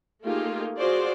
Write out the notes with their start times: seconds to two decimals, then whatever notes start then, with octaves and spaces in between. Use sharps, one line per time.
0.23 A3 A#3 D#4 F4 G4 G#4
0.77 F4 F#4 G#4 C5 D5